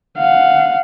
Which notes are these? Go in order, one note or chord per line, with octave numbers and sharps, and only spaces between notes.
F5 F#5